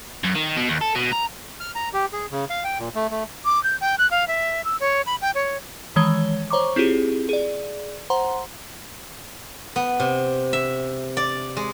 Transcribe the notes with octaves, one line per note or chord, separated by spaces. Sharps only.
F#2
D#3
B2
D#2
A4
B2
A#5
F6
A#5
G4
G#4
C#3
F5
G5
A#2
A3
A3
D6
G6
G5
F#6
F5
E5
E6
C#5
B5
G5
C#5
D#3 E3 G#3 C#5 G#6 G7
C5 C#5 A#5 C#6 D6
C4 E4 F4 G4 G#4
G#4 D5
C5 F#5 A#5 C6
B3
C3
E5
D5
G#3